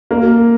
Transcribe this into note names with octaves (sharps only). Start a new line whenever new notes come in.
A#3